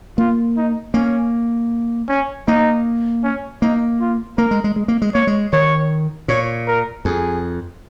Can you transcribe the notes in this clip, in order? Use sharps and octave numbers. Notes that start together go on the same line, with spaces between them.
A#3 F4
D#4
A#3 C#4
C#4
A#3 D#4
C#4
A#3 D#4
F4
A#3 A#4
G#3
G#3
G#3
A#3
G#3
A#3 C#5
G#3
D#3 C#5
A#2 C#5
A#4
F2 G#4